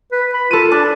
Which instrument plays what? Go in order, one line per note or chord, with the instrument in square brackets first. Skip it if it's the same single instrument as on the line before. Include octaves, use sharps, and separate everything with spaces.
[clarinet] B4
B5
[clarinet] F4 [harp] A4 D#7
[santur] D4 [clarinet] D5